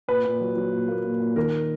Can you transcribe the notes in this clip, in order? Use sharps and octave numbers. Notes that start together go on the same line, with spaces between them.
A#2 B4
A#2
F#3
F#3
A#2
A#3
A#2
A#2
D#3 A#4